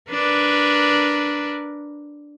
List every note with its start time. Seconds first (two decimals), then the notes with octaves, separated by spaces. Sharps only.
0.11 D4 A#4 B4